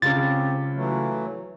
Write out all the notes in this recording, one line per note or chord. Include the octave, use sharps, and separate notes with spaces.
C#2 C4 C#4 G4 A6
E3 F#3 A3